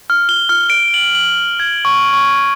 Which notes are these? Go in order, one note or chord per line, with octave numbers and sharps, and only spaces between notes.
F6
G7
F6
D7
F#7
F#7
G#6
C#6
C#6